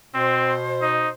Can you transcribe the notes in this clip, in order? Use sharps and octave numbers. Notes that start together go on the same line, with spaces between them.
B2 C4 C5
D#4